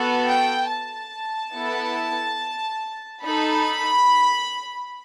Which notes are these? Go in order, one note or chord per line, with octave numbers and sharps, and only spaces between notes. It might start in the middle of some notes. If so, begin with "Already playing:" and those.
Already playing: B3 F#4 A4
G5
A5
B3 E4 A4
D#4 A4 B5